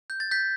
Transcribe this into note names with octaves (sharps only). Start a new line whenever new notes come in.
G6
A6
G6 B6